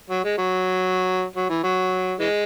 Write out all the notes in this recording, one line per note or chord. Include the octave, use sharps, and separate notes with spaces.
F#3
G#3
F#3
F#3
E3
F#3
E3 G#3